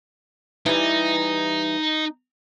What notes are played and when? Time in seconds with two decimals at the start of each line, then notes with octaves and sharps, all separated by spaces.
0.66 E3 G3 D#4